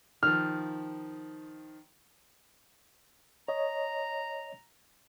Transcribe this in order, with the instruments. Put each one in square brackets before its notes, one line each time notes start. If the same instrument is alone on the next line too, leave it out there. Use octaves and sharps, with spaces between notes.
[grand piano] D#3 F3 [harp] F6
[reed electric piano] C#5 D#5 [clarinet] A#5